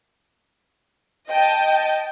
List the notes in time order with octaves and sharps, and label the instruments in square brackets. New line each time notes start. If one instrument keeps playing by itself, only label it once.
[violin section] D#5 G5 A5